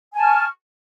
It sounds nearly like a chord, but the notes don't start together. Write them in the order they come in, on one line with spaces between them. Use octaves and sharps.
G#5 A5 F6 C#6